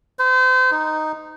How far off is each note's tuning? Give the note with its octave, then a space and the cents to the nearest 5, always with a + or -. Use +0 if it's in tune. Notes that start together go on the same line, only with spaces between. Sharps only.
C5 -35
D#4 -5